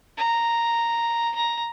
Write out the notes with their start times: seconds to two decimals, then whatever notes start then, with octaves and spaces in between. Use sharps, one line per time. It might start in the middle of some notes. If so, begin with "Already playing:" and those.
0.18 A#5
1.35 A#5